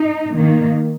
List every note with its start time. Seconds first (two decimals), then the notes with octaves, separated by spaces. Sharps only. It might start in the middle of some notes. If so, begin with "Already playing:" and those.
Already playing: D#4
0.34 D#3 A#3